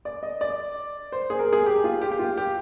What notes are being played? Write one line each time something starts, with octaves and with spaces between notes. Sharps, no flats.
D5
D#5
D5
C5
G#4
A#4
G#4
G4
F4
G4
G4
F4
G4